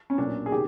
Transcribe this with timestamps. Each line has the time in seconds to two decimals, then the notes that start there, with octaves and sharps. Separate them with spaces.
0.10 C#4
0.18 B1 A#2 F#3 D4
0.46 G#4
0.52 C3 D#3 G4